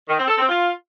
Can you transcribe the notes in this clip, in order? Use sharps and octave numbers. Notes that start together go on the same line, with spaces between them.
D#3
C4
A4
C4
F4